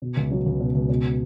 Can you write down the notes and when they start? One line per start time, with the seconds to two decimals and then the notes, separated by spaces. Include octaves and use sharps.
0.02 B2
0.17 C#2
0.31 F#3
0.46 C#2
0.60 B2
0.75 C#2
0.89 B2